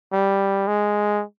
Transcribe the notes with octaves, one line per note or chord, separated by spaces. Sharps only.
G3
G#3